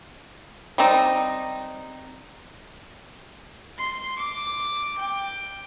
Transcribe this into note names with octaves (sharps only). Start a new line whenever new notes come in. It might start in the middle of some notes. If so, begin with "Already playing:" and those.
G3 C4 D#4
C6
D6
G5